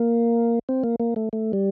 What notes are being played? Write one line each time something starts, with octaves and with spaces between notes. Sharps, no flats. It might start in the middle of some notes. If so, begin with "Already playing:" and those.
Already playing: A#3
C4
A#3
A#3
A3
A3
G3